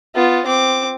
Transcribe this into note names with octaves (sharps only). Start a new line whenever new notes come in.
B3 F4
C4 D6